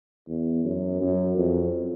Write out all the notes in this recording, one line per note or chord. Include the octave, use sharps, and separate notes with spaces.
E2
F#2
F#2
F2